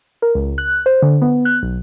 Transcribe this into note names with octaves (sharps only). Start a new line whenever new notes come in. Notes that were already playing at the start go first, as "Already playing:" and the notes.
A#4
C#2
F#6
C5
D3
B3
F#6
B1